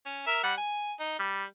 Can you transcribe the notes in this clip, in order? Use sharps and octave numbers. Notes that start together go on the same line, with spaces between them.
C#4
A#4 E5
G3 F#5
G#5
D#4
G3